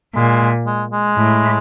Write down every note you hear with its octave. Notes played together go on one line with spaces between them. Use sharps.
A#2 G#3
G#3
G#3
A2